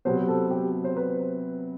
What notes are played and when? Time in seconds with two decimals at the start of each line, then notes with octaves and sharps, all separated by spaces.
0.05 C3 F#3 B3 C5
0.29 A4
0.51 G4
0.84 C5
0.97 B4